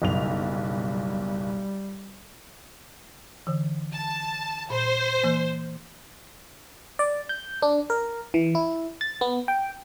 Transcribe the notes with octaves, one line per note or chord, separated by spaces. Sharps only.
F#1 B1 G3 F7
D3 E3
A5
A#2 C5
E3 A#3
D5
G6
D4
A#4
E3
E4
A6
B3
G5